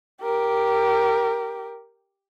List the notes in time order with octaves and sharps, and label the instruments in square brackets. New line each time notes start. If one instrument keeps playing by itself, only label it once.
[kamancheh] G4 A#4